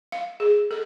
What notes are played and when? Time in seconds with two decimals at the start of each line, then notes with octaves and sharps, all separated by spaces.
0.12 F5
0.40 G#4
0.71 A4